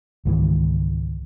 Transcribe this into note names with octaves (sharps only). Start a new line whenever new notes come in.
C#2 G#2 D#3 E3